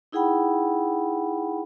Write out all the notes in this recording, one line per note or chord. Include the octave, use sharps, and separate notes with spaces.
D#4 E4 G#4 F#5 G5 B5